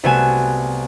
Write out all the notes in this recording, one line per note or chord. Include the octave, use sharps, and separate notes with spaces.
C2 A3 B3 F#4 G#5 E7